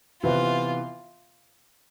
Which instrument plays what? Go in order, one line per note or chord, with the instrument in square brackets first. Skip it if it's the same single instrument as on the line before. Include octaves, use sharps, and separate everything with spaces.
[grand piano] C3 E3 B3 [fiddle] F4